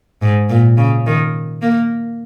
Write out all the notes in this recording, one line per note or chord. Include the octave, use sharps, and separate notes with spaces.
G#2
A#2
C#3
D#3
A#3